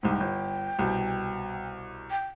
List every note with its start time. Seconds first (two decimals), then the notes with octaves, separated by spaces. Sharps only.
0.03 C2 G#2 G5
0.20 G1
0.79 C2 B2
2.11 G5